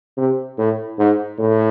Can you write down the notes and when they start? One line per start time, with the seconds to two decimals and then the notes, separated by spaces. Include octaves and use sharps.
0.17 C3
0.58 A2
0.99 G#2
1.39 A2